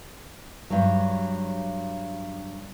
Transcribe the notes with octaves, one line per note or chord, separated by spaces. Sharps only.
G2 F#3